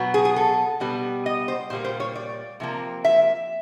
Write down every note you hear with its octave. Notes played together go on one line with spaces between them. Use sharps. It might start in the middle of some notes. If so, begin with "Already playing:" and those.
Already playing: B2 F#3 B3
G#4
G#4
A4
B2 G3 B3
D#5
C5
A#2 G3 A#3 C5
C5
C#5
D5
C3 F3 A#3
E5